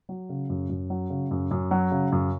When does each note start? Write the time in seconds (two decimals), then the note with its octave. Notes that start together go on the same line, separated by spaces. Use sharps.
0.09 F#3
0.29 C#3
0.50 F#2
0.69 F#2
0.90 F#3
1.10 C#3
1.31 F#2
1.51 F#2
1.71 F#3
1.91 C#3
2.12 F#2